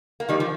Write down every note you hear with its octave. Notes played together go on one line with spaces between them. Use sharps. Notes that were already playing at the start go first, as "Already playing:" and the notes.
A#3
D#3 G3
F3